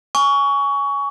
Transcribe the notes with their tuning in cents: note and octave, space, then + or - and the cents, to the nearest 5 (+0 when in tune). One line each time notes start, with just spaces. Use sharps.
G#5 +0 C#6 +25